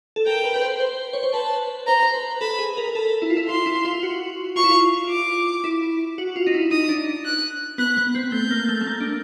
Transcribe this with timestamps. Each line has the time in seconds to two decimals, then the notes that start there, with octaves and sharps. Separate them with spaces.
0.16 A4
0.26 A#4 G5
0.44 B4
0.56 B4
0.62 C5
0.80 C5
1.13 C#5
1.23 C5
1.33 B4 A5
1.87 C5 A#5
2.02 C5
2.14 B4
2.41 A4 B5
2.59 G#4
2.77 A#4
2.88 A#4
2.95 A4 B5
3.22 E4
3.30 F4
3.37 E4
3.49 F4 C6
3.66 E4
3.85 F4
4.03 F#4
4.56 F4 C#6
4.64 E4
4.70 F4
5.09 D6
5.64 E4
6.18 F#4
6.36 F4
6.47 D#4
6.54 E4
6.71 D#4 D#6
6.89 D4
7.25 F#6
7.78 B3 F#6
7.97 B3
8.15 C4
8.32 A3 G6
8.51 A#3
8.69 A3
8.81 A3
8.87 A#3
9.00 D4